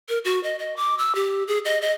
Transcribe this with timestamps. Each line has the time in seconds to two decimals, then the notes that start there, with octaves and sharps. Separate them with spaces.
0.09 A#4
0.25 F#4
0.43 D#5
0.59 D#5
0.76 D6
0.98 E6
1.15 G4
1.48 G#4
1.65 D#5
1.82 D#5